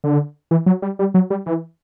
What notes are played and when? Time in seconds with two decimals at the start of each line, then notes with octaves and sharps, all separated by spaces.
0.04 D3
0.51 E3
0.66 F#3
0.82 G3
0.99 G3
1.14 F#3
1.30 G3
1.46 E3